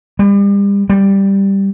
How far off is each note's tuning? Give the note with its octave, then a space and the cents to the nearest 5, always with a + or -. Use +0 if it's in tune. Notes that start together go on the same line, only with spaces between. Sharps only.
G3 +35
G3 +5